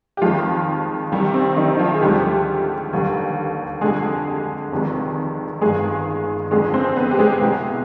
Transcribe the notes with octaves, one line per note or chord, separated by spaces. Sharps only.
G4
F2 D#3 F3 G#3 F4
C2 C3 D#3 G3 G4
C4
D#3 D#4
D#4
F3 F4
G#4
D2 D3 F3 G3 G#3 G4
F1 D#2 D3 G3
F2 D3 G3 G#3 G#4
F1 F2 C3 D#3 G#3
G1 G2 D#3 G#3 G#4
F1 F2 D3 G#3 G#4
C4 C5
B3 B4
G4
G#3 G#4
C2 B2 G#3